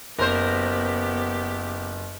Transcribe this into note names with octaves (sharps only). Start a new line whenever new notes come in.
F#1 B3 G4 A#4 C5